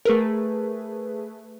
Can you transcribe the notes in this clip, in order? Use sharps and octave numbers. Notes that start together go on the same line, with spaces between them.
A3 G#4 A#4 B4